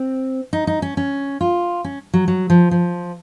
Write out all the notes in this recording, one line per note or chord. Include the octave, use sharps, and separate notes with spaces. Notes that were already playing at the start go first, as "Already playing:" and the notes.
Already playing: C4
D#4
D#4
C#4
C#4
F4
C#4
F#3
F#3
F3
F3